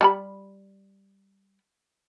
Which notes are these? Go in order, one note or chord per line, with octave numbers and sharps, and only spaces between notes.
G3 A5 B5